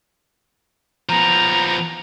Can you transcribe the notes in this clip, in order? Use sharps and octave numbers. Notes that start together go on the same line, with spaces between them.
F3 B3 A#5